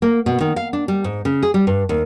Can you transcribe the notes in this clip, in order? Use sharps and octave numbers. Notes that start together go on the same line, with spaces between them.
A#3
B2
D#3
F5
D4
G3
G#2
C#3
G#4
G3
G2
D#2